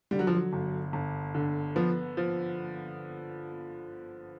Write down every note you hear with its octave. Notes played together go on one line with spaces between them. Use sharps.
D3 G3
F#3
F3
F#3
G1
G1
D3
F3 B3
F3